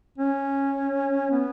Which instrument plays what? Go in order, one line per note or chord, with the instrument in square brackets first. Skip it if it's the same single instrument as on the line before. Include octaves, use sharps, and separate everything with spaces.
[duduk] C#4
B3